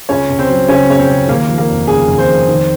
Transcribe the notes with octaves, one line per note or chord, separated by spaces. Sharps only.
C#2 C#4 C#5
C#2
C4 C5
F#3
C#3 C#4 C#5
C#3 C#5
C4 C5
C#2
D#2 A#3 A#4
F3
A#3 A#4
F1
C#3 G#4
D#2
C4 C5
F1
D#3